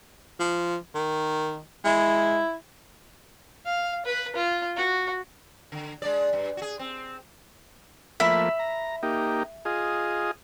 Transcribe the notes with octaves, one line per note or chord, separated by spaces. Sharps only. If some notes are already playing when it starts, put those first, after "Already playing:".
F3
D#3
G#3 E4
F5
B4
F4
F#4
D3
G#3 D4 D5
G2
F#4 G#4
C4
F3 A3 A#3 E5 B5
A#5
A#3 D#4 G4
F4 G#4 D#5